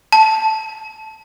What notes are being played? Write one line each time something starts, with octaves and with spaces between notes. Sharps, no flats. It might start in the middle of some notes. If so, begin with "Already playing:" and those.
A5